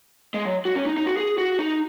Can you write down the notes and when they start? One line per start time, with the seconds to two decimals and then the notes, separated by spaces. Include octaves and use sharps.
0.34 G#3
0.45 F#3
0.65 F#4
0.75 C#4
0.86 D#4
0.97 D#4
1.06 F#4
1.17 G#4
1.38 F#4
1.59 D#4